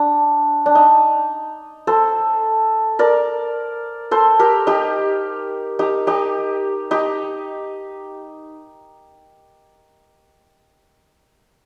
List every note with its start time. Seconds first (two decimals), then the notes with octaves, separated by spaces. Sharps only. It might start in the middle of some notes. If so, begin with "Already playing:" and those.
Already playing: D4
0.66 D4
0.75 D#4
1.87 A4 C5
2.99 A#4 D5
4.11 A4 C5
4.39 G4 A#4
4.67 D#4 G4
5.79 D#4 G4
6.07 D#4 G4
6.91 D#4 G4